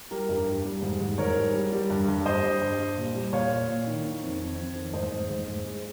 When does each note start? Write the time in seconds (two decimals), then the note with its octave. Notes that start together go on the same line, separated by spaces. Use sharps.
0.11 G3 G4 A#4
0.29 G2 G4 A#4
0.47 G2
0.65 G3
0.82 G#2
1.01 G#2
1.18 G#2 A#4 C#5
1.37 G3
1.54 G3
1.72 G3
1.90 G2
2.08 G2
2.26 G2 C5 D#5
2.43 G3
2.62 G2
2.79 G3
2.97 A#2
3.15 G3
3.33 A#2 C#5 F5
3.51 A#2
3.68 A#2
3.87 D#3
4.05 D#3
4.22 F2
4.40 F2
4.58 F2
4.76 D#3
4.94 G#2 C5 D#5
5.12 G#2
5.30 G#2
5.48 G#2
5.66 G#3